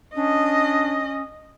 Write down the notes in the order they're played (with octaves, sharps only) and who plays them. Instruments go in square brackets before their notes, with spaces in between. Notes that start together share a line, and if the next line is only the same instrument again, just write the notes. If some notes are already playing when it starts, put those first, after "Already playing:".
[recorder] C#4 [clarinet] D4 [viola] D#5